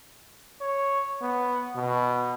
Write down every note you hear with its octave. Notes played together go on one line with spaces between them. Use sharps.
C#5
B3
B2